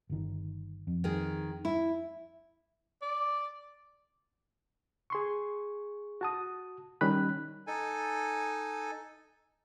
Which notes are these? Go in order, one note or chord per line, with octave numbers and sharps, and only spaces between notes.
G1 D#3
F2
D#3 G#4
E4
D5
G#4 C6 C#6
F#4 A5 D#6
D#3 G3 C#4 D#4 B5 F#6
D#4 A4 G#5